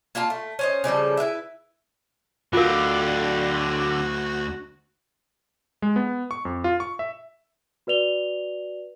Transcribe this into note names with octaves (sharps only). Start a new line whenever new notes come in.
A#3 F4 F5 A5
A3
C#4 C5 D#5
C#3 F3 G3 A4
E4 F4 B4 E5
D2 D3 F4 F#4 A#4 F5
G#3
B3
C#6
F2
F4
C#6
E5
F#4 B4 D5 F7 G7